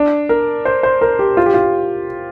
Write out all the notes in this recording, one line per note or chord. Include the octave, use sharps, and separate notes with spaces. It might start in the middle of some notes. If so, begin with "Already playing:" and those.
Already playing: D4
A#4
C5
C5
A#4
G4
F4
G4
F4